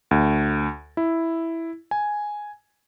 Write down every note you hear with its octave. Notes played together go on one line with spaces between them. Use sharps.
D2
E4
G#5